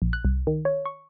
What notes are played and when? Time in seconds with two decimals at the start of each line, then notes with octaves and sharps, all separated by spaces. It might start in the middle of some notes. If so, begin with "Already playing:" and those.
0.02 A#1
0.13 F#6
0.25 C2
0.47 D#3
0.65 C#5
0.86 C#6